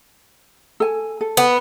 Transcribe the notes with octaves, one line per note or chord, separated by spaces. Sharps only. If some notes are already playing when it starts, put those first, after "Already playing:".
A4 G#5
A4
B3